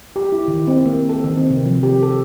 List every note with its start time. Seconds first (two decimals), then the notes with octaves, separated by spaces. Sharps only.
0.16 G4
0.32 E4
0.48 D#3
0.67 C4
0.86 A#3
1.09 A4
1.24 D#3
1.37 C4
1.50 C3
1.65 F3
1.83 G4
2.03 A4